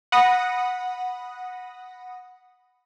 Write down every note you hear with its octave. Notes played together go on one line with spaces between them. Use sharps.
F#5 B5 D#6 A#6